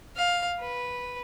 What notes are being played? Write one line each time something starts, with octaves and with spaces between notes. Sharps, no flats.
F5
B4